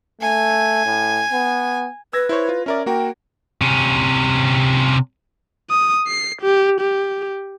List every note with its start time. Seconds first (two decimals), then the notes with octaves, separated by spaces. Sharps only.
0.21 A3 G#5
0.86 A2
1.33 B3
2.13 B4 E6 G#6 A#6
2.29 E4 C5 C#5
2.49 F4
2.66 C#4 A#4 D5 E5
2.86 A#3 F#4 A#4 G5
3.62 C3 C#4
5.70 D#6
6.08 C7
6.42 G4
6.81 G4